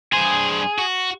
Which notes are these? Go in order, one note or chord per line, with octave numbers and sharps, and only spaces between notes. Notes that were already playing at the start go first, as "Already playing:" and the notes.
G2 G#4 C5
F#4